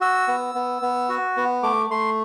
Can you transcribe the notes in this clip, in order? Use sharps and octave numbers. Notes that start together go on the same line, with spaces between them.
F#4 E6
B3
B3
B3
F#4
B3
A3 D6
A3 C6